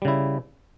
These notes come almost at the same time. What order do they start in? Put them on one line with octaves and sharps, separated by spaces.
G3 C#3 E4